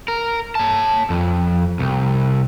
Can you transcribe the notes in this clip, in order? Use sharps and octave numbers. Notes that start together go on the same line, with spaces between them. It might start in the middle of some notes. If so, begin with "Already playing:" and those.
A#4
C#5 A5
F2
C2